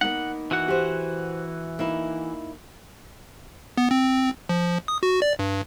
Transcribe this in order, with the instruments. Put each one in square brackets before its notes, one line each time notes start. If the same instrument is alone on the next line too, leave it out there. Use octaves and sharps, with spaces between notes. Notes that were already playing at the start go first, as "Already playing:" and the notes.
[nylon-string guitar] A#3 B3 D#4 [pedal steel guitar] F#5
[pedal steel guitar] E3 F#4 F#5
[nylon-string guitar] G4 C5
A#3 D#4 E4
[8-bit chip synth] B3
C4
F3
D#6
F#4
D5
G2